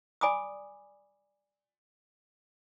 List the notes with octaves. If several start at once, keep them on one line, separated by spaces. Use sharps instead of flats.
D5 G#5 B5 D6 D#6